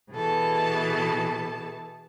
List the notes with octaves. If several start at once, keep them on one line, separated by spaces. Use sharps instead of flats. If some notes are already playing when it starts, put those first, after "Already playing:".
B2 E3 G#4 A4 A5